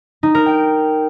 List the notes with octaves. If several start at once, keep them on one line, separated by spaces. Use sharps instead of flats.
D#4
A#4
G5